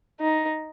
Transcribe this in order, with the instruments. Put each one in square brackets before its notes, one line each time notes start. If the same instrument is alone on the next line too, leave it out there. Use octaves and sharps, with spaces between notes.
[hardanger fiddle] D#4